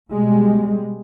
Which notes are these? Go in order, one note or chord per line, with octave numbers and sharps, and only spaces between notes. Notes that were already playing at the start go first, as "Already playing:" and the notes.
B2 G3 G#3